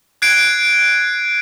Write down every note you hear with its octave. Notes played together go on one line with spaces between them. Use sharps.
F#6 G#6 C7 D7